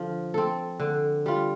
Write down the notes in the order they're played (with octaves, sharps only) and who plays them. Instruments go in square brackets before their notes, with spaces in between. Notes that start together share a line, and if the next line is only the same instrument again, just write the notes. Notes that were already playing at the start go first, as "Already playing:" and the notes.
Already playing: [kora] D3 F3
C4 A4
D3
G3 F4